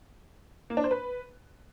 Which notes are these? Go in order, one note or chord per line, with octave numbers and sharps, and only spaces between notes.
A#3
D4
C5
B4